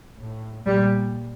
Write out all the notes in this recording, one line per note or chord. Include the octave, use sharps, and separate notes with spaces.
A2
A#2 G3